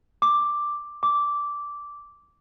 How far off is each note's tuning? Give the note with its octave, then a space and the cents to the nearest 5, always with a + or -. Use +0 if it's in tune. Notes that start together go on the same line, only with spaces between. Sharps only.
D6 +5
D6 -10